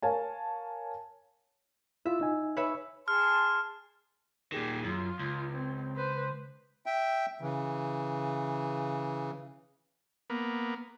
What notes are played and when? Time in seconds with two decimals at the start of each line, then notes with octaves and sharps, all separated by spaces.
0.02 A#4 C#5 F5 G#5 A5
2.06 E4 F4 E5
2.21 D#4 G#5
2.57 B4 C#5 E5
3.08 G#4 A5 C6 F6
4.52 A#2 D#3 G4 G#4
4.84 F#2 F4
5.19 C#2
5.51 C4
5.96 B4 C5
6.86 E5 G5
7.41 C#3 E3
10.30 A#3 B3